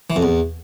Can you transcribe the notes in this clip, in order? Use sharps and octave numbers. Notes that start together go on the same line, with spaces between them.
E3
F2
E2